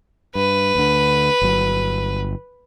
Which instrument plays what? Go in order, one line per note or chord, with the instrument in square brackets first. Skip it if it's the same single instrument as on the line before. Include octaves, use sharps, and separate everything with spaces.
[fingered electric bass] G2 [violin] B4
[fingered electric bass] D2 D3
G1 F#3